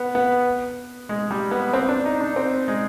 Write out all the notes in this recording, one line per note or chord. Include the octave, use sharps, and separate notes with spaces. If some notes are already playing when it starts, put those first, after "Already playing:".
Already playing: B3
B3
G#3
G3
B3
C4
D4
D#4
D4
C4
G#3